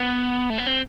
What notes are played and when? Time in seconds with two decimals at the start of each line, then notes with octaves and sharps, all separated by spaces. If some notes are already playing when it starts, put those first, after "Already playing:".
Already playing: B3
0.50 A3
0.58 B3
0.67 C4